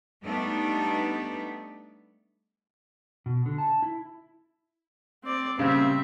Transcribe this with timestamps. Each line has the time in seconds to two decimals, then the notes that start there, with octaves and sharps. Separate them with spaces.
0.24 G3 A3 B3 D4 D#4
3.26 B2
3.46 D3
3.58 A5
3.82 E4
5.23 C4 D5
5.58 A#2 C#3 G3 C4 E5